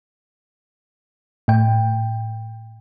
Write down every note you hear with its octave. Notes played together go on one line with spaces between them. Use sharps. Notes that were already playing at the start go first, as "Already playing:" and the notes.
A2 G5